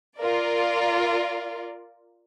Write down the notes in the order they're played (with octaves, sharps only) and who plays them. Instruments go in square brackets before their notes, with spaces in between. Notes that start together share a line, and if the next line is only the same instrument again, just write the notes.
[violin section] F4 A#4 D5